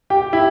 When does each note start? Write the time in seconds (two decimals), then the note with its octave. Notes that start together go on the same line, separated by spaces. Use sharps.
0.10 G4 G5
0.33 E4 E5